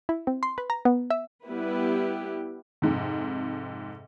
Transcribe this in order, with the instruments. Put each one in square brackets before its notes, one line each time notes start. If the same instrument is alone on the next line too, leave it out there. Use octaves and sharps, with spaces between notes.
[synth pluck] E4
C4
C6
B4
A#5
B3
E5
[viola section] G3 B3 E4 G4 B4
[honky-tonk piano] F2 G#2 C3